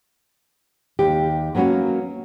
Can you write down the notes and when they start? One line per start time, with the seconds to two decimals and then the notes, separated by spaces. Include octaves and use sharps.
0.99 D#2 G4
1.55 F#3 A#3 B3 C#4 F#4